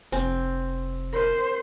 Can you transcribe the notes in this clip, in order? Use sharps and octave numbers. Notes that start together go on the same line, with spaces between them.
F1 C4 G#5
A#4 C5